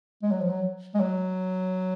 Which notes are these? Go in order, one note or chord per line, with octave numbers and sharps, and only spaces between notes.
G#3
F#3
F3
F#3
G#3
F#3